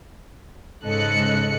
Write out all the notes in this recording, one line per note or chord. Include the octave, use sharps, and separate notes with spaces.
G#2 C#3 A4 D#5 F#6 C#7